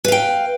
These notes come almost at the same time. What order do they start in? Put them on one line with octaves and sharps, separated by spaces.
B4 F5 G5